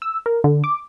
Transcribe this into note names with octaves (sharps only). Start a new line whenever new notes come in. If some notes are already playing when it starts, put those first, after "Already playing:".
E6
A#4
D3
D6